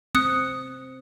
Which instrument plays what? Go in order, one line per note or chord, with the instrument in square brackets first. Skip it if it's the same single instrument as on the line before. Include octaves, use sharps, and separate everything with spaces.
[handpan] C4 [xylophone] D#6 F#6 C#7